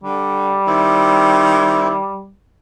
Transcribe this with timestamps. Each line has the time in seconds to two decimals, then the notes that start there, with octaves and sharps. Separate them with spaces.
0.03 D3 G3
0.67 D#3 C4 E4